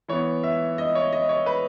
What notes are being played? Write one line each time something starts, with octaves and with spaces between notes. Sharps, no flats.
E3 B3 C#5
E5
D#5
C#5
D#5
C#5
B4